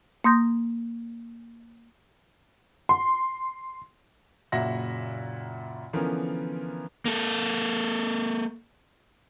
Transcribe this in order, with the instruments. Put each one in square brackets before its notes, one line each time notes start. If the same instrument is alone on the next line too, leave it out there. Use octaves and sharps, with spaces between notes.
[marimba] A#3 C6 D#6 G6 A#6
[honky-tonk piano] C6
[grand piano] F#1 A#2 F#4 E5 F#5 A#6
D3 E3 F3 B3 C#4 A#4
[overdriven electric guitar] A#3 A4